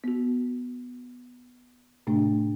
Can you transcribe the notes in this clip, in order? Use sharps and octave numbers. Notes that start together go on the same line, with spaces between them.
B3 F#4
A2 C3 A3 D4